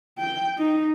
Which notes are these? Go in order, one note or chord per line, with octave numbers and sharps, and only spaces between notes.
G5
D#4